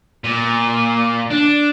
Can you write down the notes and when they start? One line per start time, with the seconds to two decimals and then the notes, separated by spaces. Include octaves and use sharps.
0.24 A#2
1.31 D4